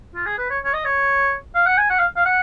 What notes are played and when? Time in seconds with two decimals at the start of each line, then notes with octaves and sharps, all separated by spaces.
0.15 F4
0.26 G#4
0.38 B4
0.50 C#5
0.65 C#5
0.73 D#5
0.85 C#5
1.55 F5
1.66 F#5
1.78 G#5
1.90 F#5
1.99 F5
2.16 F5
2.25 F#5